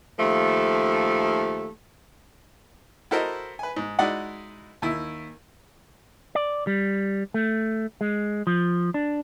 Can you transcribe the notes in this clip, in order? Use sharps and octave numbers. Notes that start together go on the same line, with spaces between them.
D#2 F3 A3
E4 F#4 A4 A#4 C5 D#5
B4 G#5
G#2
G#3 D#4 E4 F#4 D5 F#5
D#2 E4
D5
G3
A3
G#3
F3
D4